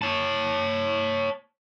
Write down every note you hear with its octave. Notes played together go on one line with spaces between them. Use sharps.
C#5 A5